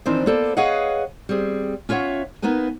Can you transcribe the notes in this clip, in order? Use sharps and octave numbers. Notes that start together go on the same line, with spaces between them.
D#3 E3 C4 D4 D#4 C5
A#3 B3 A4 C5 D5
G#4 B4 C#5 D#5 F5 F#5
G3 C4 G#4
C#4 F4 C#5 E5 F#5
A#3 B3 D#4 B4 G#5